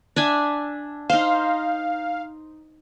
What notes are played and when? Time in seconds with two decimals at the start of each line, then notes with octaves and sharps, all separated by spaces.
0.16 D4 E5 G#5
1.10 D#4 C5 F5